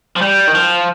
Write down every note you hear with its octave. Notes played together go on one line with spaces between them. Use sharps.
F3
G3 G5
D#3
F3